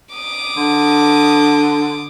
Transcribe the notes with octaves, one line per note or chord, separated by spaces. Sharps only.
D6 D#6
D3